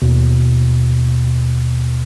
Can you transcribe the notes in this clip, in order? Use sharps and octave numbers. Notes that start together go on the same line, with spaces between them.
D#2 B2